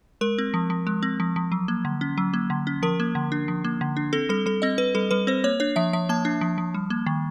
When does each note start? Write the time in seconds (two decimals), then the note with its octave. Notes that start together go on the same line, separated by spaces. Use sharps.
0.21 G#3 A#4
0.38 C4
0.54 F3
0.70 F3
0.87 G#3
1.03 C4
1.20 F3
1.36 F3
1.52 F#3
1.68 A#3
1.85 D3
2.01 C#4
2.18 F#3
2.34 A#3
2.50 D3
2.67 C#4
2.83 F3 A#4
3.00 A#3
3.15 D3
3.32 D4
3.48 F3
3.64 A#3
3.81 D3
3.97 D4
4.13 C4 A4
4.29 G3 A4
4.46 G3 A4
4.62 C4 D#5
4.78 C4 B4
4.95 G3 A4
5.11 G3 B4
5.27 C4 C5
5.44 A#3 C#5
5.60 D4 C#5
5.76 F3 E5
5.93 F3 E5
6.09 A#3 A5
6.25 D4
6.41 F3
6.58 F3
6.74 G3
6.90 A#3
7.06 D#3